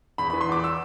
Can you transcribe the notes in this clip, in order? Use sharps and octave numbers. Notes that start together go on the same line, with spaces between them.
E2 B5
E3 B5
C6
E2 D6
E6